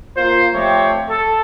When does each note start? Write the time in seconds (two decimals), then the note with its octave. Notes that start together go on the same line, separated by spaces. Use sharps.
0.16 A#3 F4 C5
0.54 F3 A3 C4 G4 C#5
1.10 A4